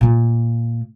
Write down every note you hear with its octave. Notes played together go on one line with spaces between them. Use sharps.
A#2 A#3